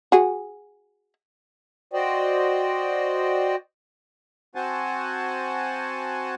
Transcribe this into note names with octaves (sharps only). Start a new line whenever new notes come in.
F#4 G#4
F#4 C5 D5 D#5 G5
C4 F#4 C5 F#5 G#5 A5